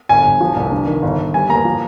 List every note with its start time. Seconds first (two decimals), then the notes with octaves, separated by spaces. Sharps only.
0.09 G1 G#5
0.25 G1
0.41 F3
0.56 C2
0.72 G2
0.87 D#3
1.02 G1
1.18 G1
1.34 G3 G#5
1.50 A#3 A#5
1.65 F3